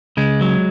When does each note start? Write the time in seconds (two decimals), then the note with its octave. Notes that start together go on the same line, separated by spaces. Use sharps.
0.17 C#3 G#3
0.41 F#3